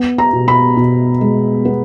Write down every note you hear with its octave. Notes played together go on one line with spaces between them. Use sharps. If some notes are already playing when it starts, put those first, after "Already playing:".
Already playing: B3
A#5
B2
B5
B2
G#3
B3